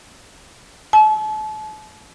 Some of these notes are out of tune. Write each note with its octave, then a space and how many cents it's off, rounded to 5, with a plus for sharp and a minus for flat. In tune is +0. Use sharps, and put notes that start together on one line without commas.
A5 -40